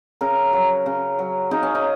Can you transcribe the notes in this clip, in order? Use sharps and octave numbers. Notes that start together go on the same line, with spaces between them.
C#3 A#4
F#3
C#3
F#3
C#3 D#4
C#4
D#4